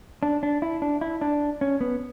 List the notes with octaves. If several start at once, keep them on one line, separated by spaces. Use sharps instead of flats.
D4
D4
E4
D4
E4
D4
C#4
B3